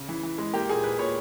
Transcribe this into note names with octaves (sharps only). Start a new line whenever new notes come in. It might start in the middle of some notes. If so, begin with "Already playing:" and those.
Already playing: C#3
E3
E3
G#3
A#3 G4
A#2 G#4
A#2 B4
A#2 C#5